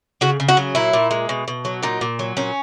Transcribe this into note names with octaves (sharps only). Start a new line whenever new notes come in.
C#3 F#4
C#3
F#4
F#3
A#2 E4
A#2
G#3
B2
B2
F#3
A#2 D#4
A#2
F#3
A#2 C#4